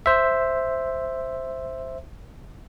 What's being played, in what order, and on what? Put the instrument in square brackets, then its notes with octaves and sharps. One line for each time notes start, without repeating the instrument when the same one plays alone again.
[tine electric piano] C5 E5